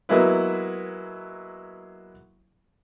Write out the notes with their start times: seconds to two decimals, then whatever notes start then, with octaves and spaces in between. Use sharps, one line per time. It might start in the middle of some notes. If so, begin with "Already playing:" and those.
0.09 F#3 G#3 A#3 B3 E4 B4